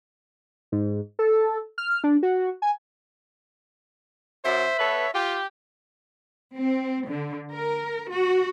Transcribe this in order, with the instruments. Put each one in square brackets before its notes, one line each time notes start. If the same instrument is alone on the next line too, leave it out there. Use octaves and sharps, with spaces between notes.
[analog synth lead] G#2
A4
F6
D4
F#4
G#5
[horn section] F#2 [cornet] C5 [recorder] E5
[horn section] B3 A4 B4 [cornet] C#5
[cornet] F4 [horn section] G4
[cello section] C4
D3
A#4
F#4